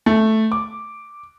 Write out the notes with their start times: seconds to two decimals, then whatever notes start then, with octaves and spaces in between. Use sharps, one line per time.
0.06 A3
0.52 D6